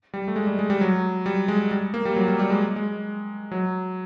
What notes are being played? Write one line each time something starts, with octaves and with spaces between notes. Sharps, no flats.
G3
A3
G#3
G3
G#3
G3
F#3
G3
G#3
G3
A#3
G3
F#3
G3
G3
G#3
G#3
F#3